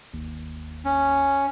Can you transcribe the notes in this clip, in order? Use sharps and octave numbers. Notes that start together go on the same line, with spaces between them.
G1 D#2
C#4